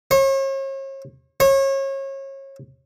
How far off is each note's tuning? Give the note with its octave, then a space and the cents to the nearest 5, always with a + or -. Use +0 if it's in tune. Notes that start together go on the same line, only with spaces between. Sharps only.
C#5 -40
C#5 -30